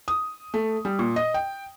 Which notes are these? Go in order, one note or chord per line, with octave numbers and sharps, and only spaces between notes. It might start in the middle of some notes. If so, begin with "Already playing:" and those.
D#6
A3
G3
A#2
D#5
G5